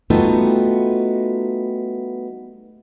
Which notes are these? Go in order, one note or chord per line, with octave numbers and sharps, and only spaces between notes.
G3 A3 B3 D#4 F4 F#4